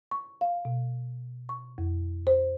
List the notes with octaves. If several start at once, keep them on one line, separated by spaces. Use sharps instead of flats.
C#6
F5
B2
C#6
F2
C5